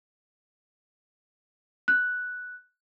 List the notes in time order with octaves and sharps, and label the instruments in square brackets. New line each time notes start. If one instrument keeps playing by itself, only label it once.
[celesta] F#6